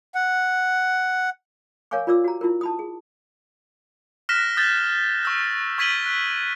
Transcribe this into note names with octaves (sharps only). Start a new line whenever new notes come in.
F#5
A#4 C#5 F5 G#5 C#6 D6
F4 A#4 D5 D6 E6
F#4 A#5
E4 F4 A#4
A5 B5 D#6
G#4
F6 F#6 A#6 B6 E7
D#6 G6 A6 G7
C#6 E6 G6
C#6 G#6 B6 D#7 F#7 G7
F#6